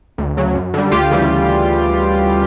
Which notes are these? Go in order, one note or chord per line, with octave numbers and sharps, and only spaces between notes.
D2
C#3 F#3
F#2
D3 G3
D2 F4 G4
C#3 E3 G3